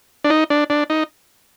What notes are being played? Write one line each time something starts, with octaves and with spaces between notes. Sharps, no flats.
D4
D#4
D4
D4
D#4